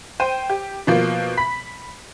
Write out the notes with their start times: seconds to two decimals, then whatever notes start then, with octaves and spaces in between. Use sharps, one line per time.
0.20 C5 G5 D#7
0.50 G4
0.87 B2 F3 A#3
1.37 B5 B6